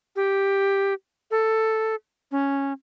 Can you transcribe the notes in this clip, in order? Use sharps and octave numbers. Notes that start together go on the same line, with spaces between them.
G4
A4
C#4